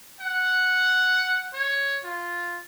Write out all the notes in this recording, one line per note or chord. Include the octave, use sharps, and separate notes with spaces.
F#5
C#5
F4